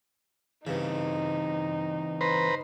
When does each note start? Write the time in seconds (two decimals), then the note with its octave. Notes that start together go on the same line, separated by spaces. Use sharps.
0.67 G2 C#3 E3 C4 D#4
2.21 B4 C5 A#5